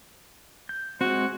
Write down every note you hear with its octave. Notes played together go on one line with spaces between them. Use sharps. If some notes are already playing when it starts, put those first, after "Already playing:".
G6
G#3 C4 F#4